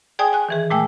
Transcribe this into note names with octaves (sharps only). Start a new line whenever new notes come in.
G#4 D5 G5 G#5 D#6
G#5 F#6
D#3 E3 G#4
A#2 G#3 A3 G5 E6